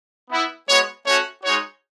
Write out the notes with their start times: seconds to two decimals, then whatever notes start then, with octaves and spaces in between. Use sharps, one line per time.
0.30 B3 E4
0.67 G#3 B3 F#4 C#5
1.06 A3 C#4 F#4 C#5
1.43 G#3 D#4 F#4 C#5